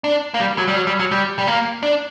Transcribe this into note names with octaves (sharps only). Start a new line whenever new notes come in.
D4
A#3
G3
F#3
G3
F#3
G3
F#3
G3
G3
A#3
D4